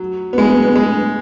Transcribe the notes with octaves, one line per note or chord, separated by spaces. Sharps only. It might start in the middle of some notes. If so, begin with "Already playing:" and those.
Already playing: F#3
B3
G#3
B3
B3
G#3